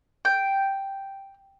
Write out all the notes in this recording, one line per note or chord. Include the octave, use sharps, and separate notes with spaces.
G5